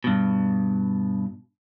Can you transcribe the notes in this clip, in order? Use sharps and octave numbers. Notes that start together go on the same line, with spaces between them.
G2 B2